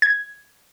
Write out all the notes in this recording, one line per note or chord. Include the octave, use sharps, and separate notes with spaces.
G#6